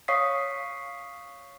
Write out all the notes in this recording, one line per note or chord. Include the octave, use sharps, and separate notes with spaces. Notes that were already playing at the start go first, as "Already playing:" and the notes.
C#5 F5 C#6 D#6 B6 C7